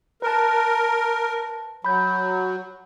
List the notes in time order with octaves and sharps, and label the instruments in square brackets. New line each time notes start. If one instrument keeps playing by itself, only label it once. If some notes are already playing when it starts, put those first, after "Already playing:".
[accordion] A#4 [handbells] B4 A5
[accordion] F#3 [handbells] B5 G6